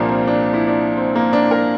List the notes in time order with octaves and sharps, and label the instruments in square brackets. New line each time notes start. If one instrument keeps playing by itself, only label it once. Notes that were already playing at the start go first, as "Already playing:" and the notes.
Already playing: [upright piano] C2 A#2 F3 A#3 D4
C4
D4
E4
D4
C4
A#3
D4
A#4